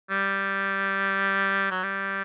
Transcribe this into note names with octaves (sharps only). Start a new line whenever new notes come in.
G3
F#3
G3